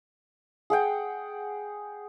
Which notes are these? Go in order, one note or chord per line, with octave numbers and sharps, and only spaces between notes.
G#4 F#5 G5